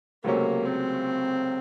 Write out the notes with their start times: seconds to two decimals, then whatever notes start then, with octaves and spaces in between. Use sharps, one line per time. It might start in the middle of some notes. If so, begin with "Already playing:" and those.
0.24 C#2 C3 F#3 A3 A#3 C#4
0.65 C4